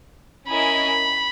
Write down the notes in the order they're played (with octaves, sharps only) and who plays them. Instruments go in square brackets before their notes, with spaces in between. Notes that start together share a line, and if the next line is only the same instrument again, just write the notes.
[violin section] C#4 E4 A#4 D#5 G#5 [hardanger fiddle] B5